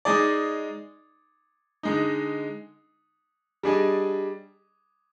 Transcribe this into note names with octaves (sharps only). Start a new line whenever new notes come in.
G#3 D#4 G#4 D5
D3 G#3 D#4
G3 D4 G#4 D#5